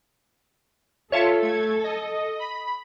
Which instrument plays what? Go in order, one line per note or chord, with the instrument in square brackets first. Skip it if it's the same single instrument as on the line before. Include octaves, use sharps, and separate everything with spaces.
[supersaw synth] F4 [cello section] A4 [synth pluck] C#5 E5 A5
[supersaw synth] A3 G#6
D#5
B5